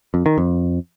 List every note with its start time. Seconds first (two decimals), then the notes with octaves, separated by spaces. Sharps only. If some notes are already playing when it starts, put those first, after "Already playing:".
0.14 F2
0.26 D#3
0.38 F2